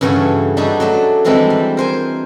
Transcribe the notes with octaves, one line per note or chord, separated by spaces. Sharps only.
G2 C#3 E3 F#4 A4 C#5
G3 D4 D#4 F#4 G#4 A4
F#3 A3 D4
E3 G3 G#3 C4 D4 E4
G3
A#4 C5 G#5